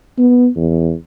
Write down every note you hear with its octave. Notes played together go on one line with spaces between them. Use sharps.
B3
E2